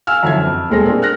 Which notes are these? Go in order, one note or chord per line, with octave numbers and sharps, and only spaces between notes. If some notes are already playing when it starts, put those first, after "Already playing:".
F5 G#5 E6 F6
F#2 D3 E3 F3 E5 G#6
F2
D#1 B2 G#3 A4 C5 A#6
A3 C4 D4 F4 G#4 A#4
F6 F#6 A#6